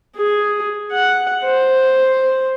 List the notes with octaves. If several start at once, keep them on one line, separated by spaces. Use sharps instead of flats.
G#4
F#5
C5